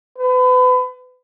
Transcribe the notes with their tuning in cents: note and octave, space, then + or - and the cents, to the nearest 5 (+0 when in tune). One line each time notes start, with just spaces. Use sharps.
B4 +35